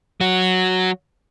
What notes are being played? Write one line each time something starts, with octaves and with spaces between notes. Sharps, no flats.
F#3 F#4